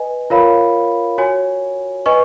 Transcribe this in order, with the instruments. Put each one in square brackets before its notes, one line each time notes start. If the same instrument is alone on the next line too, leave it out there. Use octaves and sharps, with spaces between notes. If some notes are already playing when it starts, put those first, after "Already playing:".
Already playing: [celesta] B4 D#5 G#5
F4 A#4 C#5 F5 B5
F#4 C#5 G#5
B4 D#5 G#5 C#6